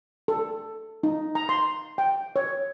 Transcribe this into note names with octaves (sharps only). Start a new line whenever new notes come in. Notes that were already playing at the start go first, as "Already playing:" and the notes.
A4
D#4
A#5
C6
G5
C#5